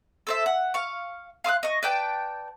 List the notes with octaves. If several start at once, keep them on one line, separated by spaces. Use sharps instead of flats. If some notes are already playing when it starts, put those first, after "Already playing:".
A4 C5 E5
F#5
F5 C#6
F5 C6 D#6 F#6
D#5 C#6
B4 D5 G5 A5